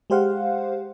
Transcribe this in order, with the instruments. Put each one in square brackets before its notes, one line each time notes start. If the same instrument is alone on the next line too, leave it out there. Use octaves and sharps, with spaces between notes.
[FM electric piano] G#3 G4 C5 F5 F#5